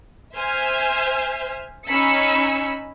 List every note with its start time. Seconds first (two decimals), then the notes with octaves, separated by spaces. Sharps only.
0.35 C5 E5 G#5 F6
1.87 C#4 D#4 G#5 B5 E6 C#7